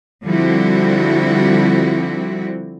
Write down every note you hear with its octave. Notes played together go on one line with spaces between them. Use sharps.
D3 F3 G3 C4 E4 F#4